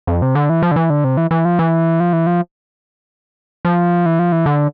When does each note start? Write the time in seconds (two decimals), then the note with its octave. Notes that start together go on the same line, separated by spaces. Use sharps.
0.07 F2
0.22 C3
0.35 D3
0.50 E3
0.62 F3
0.71 D3
0.76 E3
0.90 D3
1.04 C3
1.17 E3
1.31 E3
1.45 F3
1.59 E3
2.00 F3
2.13 E3
2.27 F3
3.65 F3
4.06 E3
4.19 F3
4.32 E3
4.46 D3